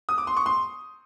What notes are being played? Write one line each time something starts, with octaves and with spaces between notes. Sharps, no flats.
D#6
D6
C6
C#6
C6